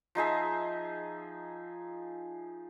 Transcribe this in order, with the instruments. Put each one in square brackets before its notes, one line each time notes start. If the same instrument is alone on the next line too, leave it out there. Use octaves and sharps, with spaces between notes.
[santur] F3 D#4 G#4 E5